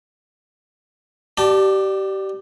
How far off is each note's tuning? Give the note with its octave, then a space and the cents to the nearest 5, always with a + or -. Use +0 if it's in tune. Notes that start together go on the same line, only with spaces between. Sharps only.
G4 -25 D5 +20 A5 +0